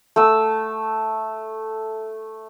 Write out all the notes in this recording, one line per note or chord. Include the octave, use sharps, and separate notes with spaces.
A3 E6